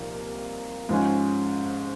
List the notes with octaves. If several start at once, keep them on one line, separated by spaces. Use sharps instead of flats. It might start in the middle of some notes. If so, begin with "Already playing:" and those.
Already playing: C2 A#2 F3 A#3 D#4
G#2 F3 G#3 C#4